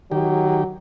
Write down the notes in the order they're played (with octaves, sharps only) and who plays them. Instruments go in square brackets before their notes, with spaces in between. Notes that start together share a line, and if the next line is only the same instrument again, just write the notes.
[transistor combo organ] D#3 G4 [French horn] F#3